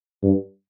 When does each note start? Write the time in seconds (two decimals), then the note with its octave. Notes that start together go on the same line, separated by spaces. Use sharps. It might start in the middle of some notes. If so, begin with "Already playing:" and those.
0.23 G2